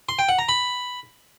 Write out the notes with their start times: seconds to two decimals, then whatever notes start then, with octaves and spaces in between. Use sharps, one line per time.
0.09 C6
0.19 G5
0.29 F#5
0.39 A#5
0.49 B5